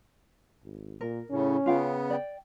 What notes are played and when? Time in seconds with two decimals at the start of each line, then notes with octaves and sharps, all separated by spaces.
0.64 G#1
1.01 A#2 A#4
1.30 A2 C#3 C#4
1.66 C#3 B3 F4 F5 G5
2.10 D5 G5